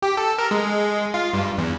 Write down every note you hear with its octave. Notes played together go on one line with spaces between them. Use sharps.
G4
A4
A#4
G#3
F4
G2
E2